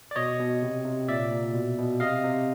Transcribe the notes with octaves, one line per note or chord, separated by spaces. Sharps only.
D5
B2 C#5 D#5
B2
C3
C3
A#2 D5 E5
A#2
B2
B2
C3 D#5 F5
C3